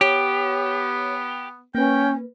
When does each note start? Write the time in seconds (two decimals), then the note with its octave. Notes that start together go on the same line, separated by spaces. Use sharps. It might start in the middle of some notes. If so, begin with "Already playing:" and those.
0.01 B3 G4 C#5
1.75 A#3 C#4 B4 G5